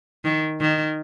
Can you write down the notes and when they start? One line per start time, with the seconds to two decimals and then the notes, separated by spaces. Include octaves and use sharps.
0.25 D#3
0.61 D#3